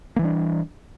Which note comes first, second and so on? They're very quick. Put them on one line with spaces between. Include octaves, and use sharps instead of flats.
A#3 E3 G3 D4